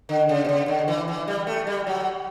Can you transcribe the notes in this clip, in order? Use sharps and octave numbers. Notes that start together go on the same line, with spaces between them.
D3
C#3
B2
C#3
D3
E3
E3
G3
A3
G3
F#3